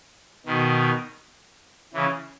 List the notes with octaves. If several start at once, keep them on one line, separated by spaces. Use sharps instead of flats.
B2 D#3
C#3 E3